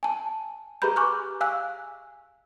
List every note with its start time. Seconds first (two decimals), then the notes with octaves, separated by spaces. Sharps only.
0.03 G#5 A5
0.82 G4 G#4 B4 A#5 B5 G6
0.96 G#5 C#6 D6 F6 F#6
1.41 F5 G#5 E6 F#6